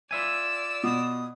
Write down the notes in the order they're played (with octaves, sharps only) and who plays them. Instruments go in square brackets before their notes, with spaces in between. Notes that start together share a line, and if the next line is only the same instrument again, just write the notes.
[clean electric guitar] F4 E5 G#5 [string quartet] D5 E6
[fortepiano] B2 [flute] D#6